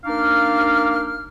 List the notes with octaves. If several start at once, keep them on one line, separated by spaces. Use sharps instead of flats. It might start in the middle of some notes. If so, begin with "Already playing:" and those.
A#3 D4 D#4 F5 D6 F6